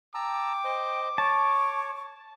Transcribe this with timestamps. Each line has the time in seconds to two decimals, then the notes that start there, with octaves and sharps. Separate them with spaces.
0.14 G5 A5 A#5 D6 E6
0.64 C5 D#5
1.18 C#5 A5 C#6